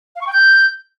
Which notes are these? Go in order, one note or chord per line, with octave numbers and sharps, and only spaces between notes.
F5
C#6
G5
G6